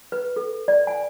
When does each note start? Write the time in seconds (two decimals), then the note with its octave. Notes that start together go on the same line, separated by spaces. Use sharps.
0.12 B4
0.36 A4
0.68 D5
0.87 G#5